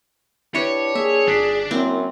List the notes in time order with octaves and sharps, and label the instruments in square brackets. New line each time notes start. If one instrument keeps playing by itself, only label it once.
[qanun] D4 G4 [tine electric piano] E4 B4 [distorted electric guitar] C#5
[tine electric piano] A#3 [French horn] G#4 [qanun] E5
[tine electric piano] G1 B6 [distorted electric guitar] D4
[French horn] F#2 [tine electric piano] A#3 E4 [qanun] C4